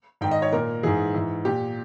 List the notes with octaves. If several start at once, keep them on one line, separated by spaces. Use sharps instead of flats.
G#2 D#3 G5
D#5
C#5
A#2 A#4
G#2 E3 G#4
G#2 E3
A#2 G4